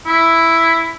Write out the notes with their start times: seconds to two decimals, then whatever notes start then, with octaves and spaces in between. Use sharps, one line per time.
0.06 E4